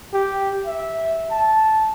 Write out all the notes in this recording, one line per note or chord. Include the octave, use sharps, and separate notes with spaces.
G4
E5
A5